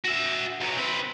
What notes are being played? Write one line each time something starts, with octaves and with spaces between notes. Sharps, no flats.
F#4 E5
B1 F#3
C4 B4